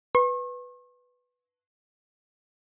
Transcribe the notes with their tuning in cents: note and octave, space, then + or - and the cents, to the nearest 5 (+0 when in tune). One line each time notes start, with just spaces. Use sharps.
B4 +0 C#6 -45